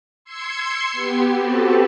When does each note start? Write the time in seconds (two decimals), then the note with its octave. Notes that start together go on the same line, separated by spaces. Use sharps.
0.25 C6 E6 G#6 C7 C#7
0.92 B3 G4
1.38 C4 F#4 G4 A4 B4 A5